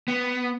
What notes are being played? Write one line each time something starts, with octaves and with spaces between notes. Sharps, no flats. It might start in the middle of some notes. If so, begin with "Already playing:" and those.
B3